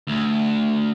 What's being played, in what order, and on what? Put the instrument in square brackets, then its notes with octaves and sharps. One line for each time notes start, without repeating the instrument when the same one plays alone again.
[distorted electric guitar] D2